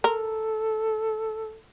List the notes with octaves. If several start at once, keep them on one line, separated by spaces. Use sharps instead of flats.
A4 A#4